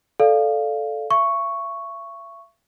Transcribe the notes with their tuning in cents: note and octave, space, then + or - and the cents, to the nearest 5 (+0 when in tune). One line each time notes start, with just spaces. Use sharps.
A4 -5 D5 +0 F5 -5
E5 +40 C#6 +0